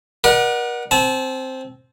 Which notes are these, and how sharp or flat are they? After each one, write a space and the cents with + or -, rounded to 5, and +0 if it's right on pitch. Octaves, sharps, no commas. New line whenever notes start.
A#4 +45 D5 +40 F#5 +0
C4 +0 A5 -35